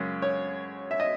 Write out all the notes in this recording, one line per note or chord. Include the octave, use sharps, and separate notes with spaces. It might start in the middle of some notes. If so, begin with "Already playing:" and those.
Already playing: F#2 C#3 G#3
C#5
E5
D#5